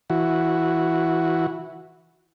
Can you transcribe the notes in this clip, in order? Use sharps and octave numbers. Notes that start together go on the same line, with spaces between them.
E3 F#4